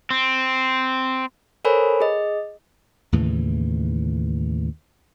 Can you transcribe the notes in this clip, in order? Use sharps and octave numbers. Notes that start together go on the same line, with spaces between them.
C4
A4 A#4 C5 C#5 G#5 B5
G#4 D#5
D#2 A2 C#3 E3